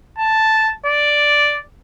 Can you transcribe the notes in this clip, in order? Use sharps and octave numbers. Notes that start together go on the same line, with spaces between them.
A5
D5